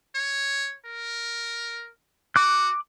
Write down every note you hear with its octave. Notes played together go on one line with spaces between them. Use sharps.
C#5
A#4
F#4 D6 F#6